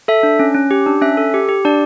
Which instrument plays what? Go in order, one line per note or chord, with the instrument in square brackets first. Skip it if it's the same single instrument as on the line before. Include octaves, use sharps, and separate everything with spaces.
[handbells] A4 E5
D4
C#4
C#4
G4
D4
C#4 E5
A4
G4
G4
D4 D5